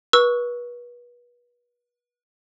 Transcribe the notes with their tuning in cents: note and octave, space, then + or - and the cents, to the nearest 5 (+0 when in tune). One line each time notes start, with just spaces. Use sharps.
B4 -35 C#6 +10 E6 -5